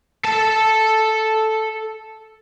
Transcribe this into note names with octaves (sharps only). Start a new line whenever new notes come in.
A4 A5